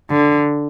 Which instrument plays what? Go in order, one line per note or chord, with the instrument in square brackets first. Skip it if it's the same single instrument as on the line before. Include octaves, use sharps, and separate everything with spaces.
[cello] D3